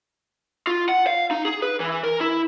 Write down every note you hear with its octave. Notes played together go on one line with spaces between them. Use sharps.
F4
F#5
F5
D#4
G#4
B4
E3
A#4
E4